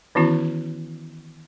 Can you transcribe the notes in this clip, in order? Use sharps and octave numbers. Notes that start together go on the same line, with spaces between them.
D#3 E3 B3 C#4 E4 F#4